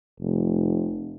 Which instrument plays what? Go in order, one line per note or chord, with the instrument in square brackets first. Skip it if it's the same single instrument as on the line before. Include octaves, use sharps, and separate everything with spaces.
[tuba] F1